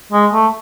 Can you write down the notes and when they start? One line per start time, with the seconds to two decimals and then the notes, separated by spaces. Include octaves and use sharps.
0.12 G#3
0.33 A3